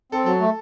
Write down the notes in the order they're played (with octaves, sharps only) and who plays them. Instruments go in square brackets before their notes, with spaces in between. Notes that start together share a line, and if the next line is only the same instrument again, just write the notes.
[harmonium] C4 [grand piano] A4
[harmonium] F#3 [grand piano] A4
[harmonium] A3